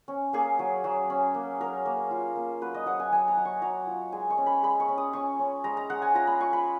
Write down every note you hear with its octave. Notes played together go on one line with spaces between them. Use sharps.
C#4
A#3 G#4
F#3
F#3
C#4
A#3
F#3 A#4
A#3
F4
A#3
F#3 B4
D#5
F#3 F#5
G#5
F#3 G#5
A#5
F#3
C#6
F#3 A#5
F4
G#3 G#5
C#6
C#4
B5
G#3 B5
C#6
C#4
D#6
C#4 C#6
C#4
G#3 A#5
A#5
G#3 F#5
G#5
F4 A#5
B5
F4 C#6
B5